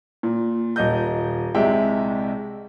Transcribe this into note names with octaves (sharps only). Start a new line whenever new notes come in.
A#2
D#1 D#5 G6
C2 C3 G#3 E5 G5